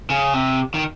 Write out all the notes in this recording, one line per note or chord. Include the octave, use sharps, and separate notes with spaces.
C#3
C3
D#3